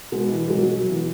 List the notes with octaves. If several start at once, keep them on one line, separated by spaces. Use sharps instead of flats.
B2 G#3
E3
G#3
B2 F#3
F#3
F#3
B2 E3